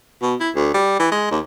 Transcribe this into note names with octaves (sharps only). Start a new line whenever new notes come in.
B2
E4
D2
G3
E3
G#3
D#2